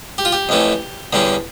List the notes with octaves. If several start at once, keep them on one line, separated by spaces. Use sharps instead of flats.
G4
F4
G4
F2 E3 A3 C#4
E2 D3 G3 C#4